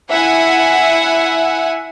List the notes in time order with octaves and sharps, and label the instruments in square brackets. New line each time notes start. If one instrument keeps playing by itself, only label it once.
[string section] E4 E5 F#5 G#5